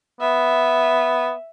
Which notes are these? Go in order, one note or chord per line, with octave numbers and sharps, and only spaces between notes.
B3 E5